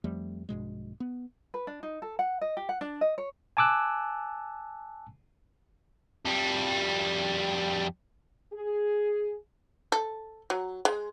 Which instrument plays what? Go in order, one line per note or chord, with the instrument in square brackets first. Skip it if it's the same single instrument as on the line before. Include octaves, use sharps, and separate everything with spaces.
[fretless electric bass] F2 F3 G3 A3
A#1 G2 B2 G#3
B3
[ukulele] B4
D4
D#4
A4
F#5
D#5
G4
F#5
D4
D#5
C#5
[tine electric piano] G#5 A5 D6 E6 F#6
[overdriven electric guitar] F2 G3
[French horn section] G#4
[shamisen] A4
F#3
G#3